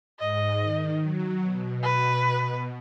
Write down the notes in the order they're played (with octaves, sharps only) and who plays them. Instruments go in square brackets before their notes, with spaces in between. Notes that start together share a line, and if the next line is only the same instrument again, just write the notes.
[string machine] G#2 [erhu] D#5
[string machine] D#3
F#3
B2
[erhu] B4